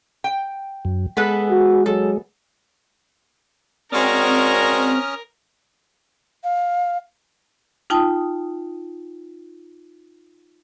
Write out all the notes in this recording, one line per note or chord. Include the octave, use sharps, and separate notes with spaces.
G5
F#2
G#3 B3 A4 B4
F#4
F#3 A4
G#3 C4 C#4 F#4 A#4 D5 D#6 F6
F5
D#4 F4 G5 A5 D#6